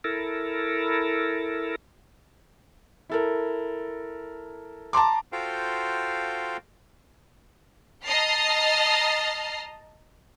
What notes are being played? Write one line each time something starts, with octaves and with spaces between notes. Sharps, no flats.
E4 A4 A#4
E4 A4 A#4
A5 A#5 C6 D6
F4 F#4 A4 C5 F5 G5
D#5 A5 A#5 F6 C7